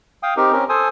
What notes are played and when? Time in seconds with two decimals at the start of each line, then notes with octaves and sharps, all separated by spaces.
0.23 F5 G5 D#6
0.37 C4 D#4 G4 A#4
0.52 C4 C#4 A#4
0.69 A4 C5 G#5 D#6